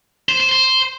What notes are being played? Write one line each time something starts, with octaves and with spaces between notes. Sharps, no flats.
C5
C5
C5